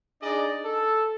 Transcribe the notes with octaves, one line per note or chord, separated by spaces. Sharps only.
D4 D#4 G#4 D5 D#5
A4